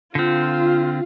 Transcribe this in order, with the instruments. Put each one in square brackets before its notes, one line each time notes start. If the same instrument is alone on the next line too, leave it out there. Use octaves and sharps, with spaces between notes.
[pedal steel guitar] D3 C4 [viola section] F4